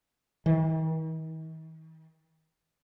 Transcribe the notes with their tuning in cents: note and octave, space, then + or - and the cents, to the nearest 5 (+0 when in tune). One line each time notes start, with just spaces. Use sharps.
D#3 +45